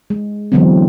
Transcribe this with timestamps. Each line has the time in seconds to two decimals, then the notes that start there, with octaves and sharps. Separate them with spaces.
0.10 G#3
0.52 D3 E3 F#3 G#3 B3 C4